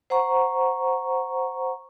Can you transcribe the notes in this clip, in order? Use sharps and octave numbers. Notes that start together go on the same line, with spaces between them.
C5 F#5 A#5 C#6